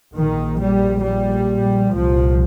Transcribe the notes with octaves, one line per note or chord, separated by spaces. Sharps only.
A#1 A#2 D#3
G3
G3
C2 A#2 F3